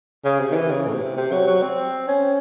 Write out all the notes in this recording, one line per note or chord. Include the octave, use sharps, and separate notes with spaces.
C#3
C3
D#3
E3
C#3
A2
C3
C3
F#3
F#3
C4
C#4